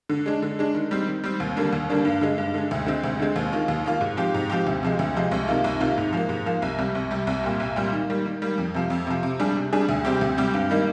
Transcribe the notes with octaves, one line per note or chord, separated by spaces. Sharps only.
D3
G#3 D4
D3
G#3 D4
D#3
G3 C4
D#3
G3 C4
D#2
D3 G3 A#3 D4
D#2
D3 G3 A#3 D4
G2
D3 G#3
G2
D3 G#3
D2
D3 G#3 C4
D2
D3 G#3 C4
D#2
D#3 A#3 F4
D#2
D#3 A#3 F4
G#2
F3 C4 G4
G#2
F3 C4 G4
D2
C3 F3 G#3
D2
C3 F3 G#3
C2
C3 D#3 A#3 F4
C2
C3 D#3 A#3 F4
G#2
F3 A#3
G#2
F3 A#3
C2
C3 G3
C2
C3 G3
C2
A#2 G3
C2
A#2 G3
D#3
G3 A#3
D#3
G3 A#3
F2
C3 F3
F2
C3 F3
C3
G3 D4 G#4
C3
G3 D4 G#4
D2
C3 G3 C4 G4
D2
C3 G3 C4 G4
G2
D#3 G3 A#3 D#4